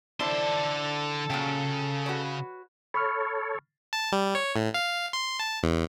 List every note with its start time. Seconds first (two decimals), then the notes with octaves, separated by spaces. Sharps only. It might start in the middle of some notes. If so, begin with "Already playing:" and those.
0.20 D3 D4 E4 A4 C5 C6
1.30 A#2 C#3 F#3 G5
2.06 F#4 B4 C#5
2.94 A4 C#5 B5 C#6 F6
3.93 A5
4.12 G3
4.35 C#5
4.56 A2
4.74 F5
5.13 C6
5.40 A5
5.63 E2